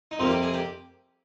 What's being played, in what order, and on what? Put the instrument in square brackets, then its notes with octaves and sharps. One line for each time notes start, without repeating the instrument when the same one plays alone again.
[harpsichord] D#4
F2 C3 G3 A#3 F4
G4
G#4
G4